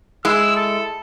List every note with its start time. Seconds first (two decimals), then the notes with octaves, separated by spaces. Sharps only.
0.25 G#3 E4 E6
0.56 A4